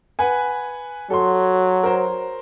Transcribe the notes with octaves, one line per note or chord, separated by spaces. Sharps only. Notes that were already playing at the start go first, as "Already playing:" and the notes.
B4 F#5 G#5
F#3 A4 C6
A#4 C5